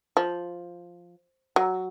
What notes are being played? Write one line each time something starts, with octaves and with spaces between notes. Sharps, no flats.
F3
F#3